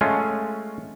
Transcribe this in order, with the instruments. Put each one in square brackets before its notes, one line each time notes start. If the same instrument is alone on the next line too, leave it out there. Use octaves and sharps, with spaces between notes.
[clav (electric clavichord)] G#3 A3 C#4 F4